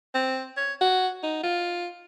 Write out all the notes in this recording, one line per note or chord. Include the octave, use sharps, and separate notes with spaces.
C4
C#5
F#4
D#4
F4